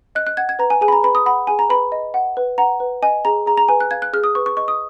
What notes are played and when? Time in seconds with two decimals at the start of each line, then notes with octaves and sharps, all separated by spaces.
0.15 D#5 F#6
0.27 F#6
0.37 F#5 G#6
0.49 G#6
0.59 B4 A#5
0.70 G#5
0.81 G#4 G#5
0.88 B5
0.92 A#5
1.03 B4 B5
1.15 D#6
1.26 F#5 B5
1.47 G#4 G#5
1.59 A#5
1.69 B4 B5
1.92 D#5
2.14 F#5
2.37 B4
2.58 F#5 A#5
2.80 B4
3.03 D#5 G#5
3.25 G#4 A#5
3.46 G#4 A#5
3.57 A#5
3.68 B4 G#5
3.80 F#6
3.91 F5 G#6
4.02 F#6
4.13 G#4 F6
4.24 D#6
4.35 B4 C#6
4.46 C#6
4.57 D#5 C#6
4.68 D#6